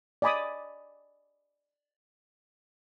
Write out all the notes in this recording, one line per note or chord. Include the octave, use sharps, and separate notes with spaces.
D5 D#5 G#5 B5 D6 D#6